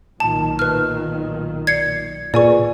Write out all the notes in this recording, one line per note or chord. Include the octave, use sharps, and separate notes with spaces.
B1 A#2 D#3 A5
B4 F6
D5 G#6 C7 C#7
A#2 F4 G#4 B4 D5 G#5 C#6